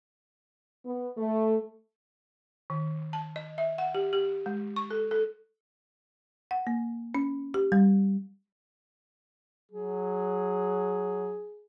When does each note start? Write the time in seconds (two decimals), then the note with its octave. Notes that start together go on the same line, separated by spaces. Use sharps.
0.85 B3
1.17 A3
2.70 D#3
3.13 A5
3.36 D#5
3.58 E5
3.78 F#5
3.95 G4
4.13 G4
4.46 G#3
4.76 C#6
4.90 A4
5.11 A4
6.51 F#5
6.67 A#3
7.15 C#4
7.54 G4
7.72 G3
9.71 F#3 G#4